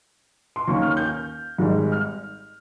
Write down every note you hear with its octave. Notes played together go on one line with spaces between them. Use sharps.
C6
D#2 D#3 A#3 C#4 C#6
F6
G6
G#1 G#2 G3
F6